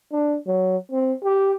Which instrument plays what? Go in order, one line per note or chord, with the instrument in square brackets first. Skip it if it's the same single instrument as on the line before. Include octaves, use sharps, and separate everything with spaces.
[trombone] D4
F#3
C4
G4